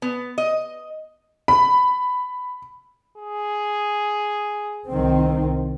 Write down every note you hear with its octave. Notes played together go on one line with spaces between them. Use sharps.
B3
D#5
B5
G#4
C2 D#3 C4